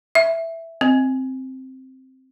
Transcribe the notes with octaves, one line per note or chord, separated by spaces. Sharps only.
E5
C4